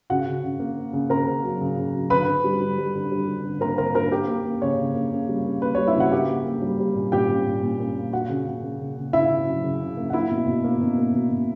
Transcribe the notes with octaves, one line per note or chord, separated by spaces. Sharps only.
C#3 F#4 F#5
C#3
C#3
A#3
C#3
C#3
C#3 A#4 A#5
C#3
F#3
C#3
C#3
F#3
D3 B4 B5
D3
G3
G3
G3
D3
G3
G3
D3
A#3 A#4 A#5
D3 A#4 A#5
D3 A#4 A#5
A#3 G4 G5
A#3
A#3
C#3 C#5
C#3
A#3
C#3
G3
A#3
A#3 B4
C#5
G3
E4 E5
C#3 F#4 F#5
A#3 G4 G5
A#3
A#3
G3
G3
A#2
A#2 G4 G5
A#2
A#2
A#2
A#3
A#2
A#3 F#4 F#5
C#3
C#3
A#3
C#3
C#3
C#3 E4 E5
C#3
F#3
C#3
C#3
A#3
F#5
A#3 E4 E5
B2
B2
A#3
B2
A#3
B2
B2